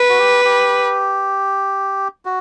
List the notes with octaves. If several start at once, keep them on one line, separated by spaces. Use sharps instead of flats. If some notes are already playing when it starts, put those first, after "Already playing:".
Already playing: B4
F#4
G4
G4
F#4